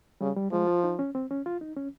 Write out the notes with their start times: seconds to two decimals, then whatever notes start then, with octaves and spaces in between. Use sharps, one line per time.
0.21 C#3 G3
0.37 G3
0.52 F3 G#3
0.67 F4
0.84 D#4
0.99 C#4
1.15 C4
1.31 C#4
1.46 F4
1.61 D#4
1.76 C#4